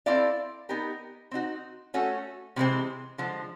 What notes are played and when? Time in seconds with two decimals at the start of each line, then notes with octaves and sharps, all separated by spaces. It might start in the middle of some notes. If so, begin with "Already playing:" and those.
0.06 C4 E4 A4 D5 F5
0.69 B3 D#4 G4 A#4
1.31 C4 D#4 F#4
1.94 A3 C#4 F#4 A4
2.56 C3 E3 G#3 C4
3.18 D3 F3 G#3